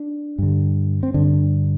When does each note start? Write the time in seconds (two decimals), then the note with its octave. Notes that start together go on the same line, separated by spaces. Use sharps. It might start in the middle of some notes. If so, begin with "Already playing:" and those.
Already playing: D4
0.38 G2 D3
1.03 C4
1.14 G2 D3 D4